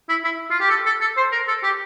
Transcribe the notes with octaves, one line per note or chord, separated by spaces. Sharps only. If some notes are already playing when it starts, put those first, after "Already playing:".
E4
E4
F4
G4
A4
A4
A4
C5
A#4
A4
G4